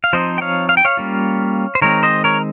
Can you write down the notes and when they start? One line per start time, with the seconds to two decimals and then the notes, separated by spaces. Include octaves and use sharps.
0.04 F5
0.13 F3 C4 D#4 C5 D#5
0.38 G5
0.41 C#5 F5
0.69 F5
0.77 G5
0.85 C#5 F5
0.97 G3 A#3 C#4 F4
1.75 C5
1.81 D#3 G#3 C4 A#4 C#5
2.03 C5 D#5
2.24 A#4 C#5